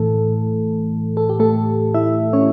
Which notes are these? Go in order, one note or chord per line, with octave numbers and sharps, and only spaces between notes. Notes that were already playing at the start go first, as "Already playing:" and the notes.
Already playing: A2 E3 A3 A4
A4
G4
A3 A4
E4 E5
C#4 C#5